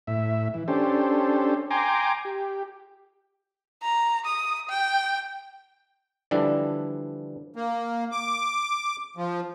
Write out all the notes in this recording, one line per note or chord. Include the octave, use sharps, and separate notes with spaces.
A2 E5
E3
C#4 D4 G4 A4 C5
G5 G#5 A#5 C6 D6
G4
A#5
D#6
G5
D3 E3 F3 G3 D4 A4
A#3
D6
F3